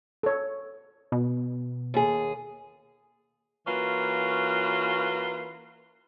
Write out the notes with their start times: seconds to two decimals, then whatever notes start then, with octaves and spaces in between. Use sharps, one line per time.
0.23 A4 C#5
1.12 B2
1.94 D#2 G#4
3.67 E3 A#3 C#4 F4 F#4 B4